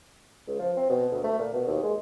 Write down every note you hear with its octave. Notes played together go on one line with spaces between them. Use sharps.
C#2
F3
C4
B2
D2
A3
A#2
B2
D#2
G#3